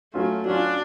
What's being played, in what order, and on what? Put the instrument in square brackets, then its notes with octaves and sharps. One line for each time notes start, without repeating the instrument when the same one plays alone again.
[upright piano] F#3 C#4 F4 [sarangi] A3
[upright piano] F#3 C#4 F4 [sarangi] D4